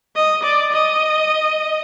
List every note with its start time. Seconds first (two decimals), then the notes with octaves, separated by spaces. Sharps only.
0.15 D#5
0.43 D5
0.72 D#5